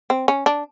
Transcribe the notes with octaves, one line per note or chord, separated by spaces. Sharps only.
C4
C#4
D4